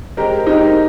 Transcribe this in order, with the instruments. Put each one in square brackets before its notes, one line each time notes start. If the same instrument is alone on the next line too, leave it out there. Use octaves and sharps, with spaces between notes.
[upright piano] G#3 C4 G4 A#4
[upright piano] G#3 C4 G4 A#4 [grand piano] D#4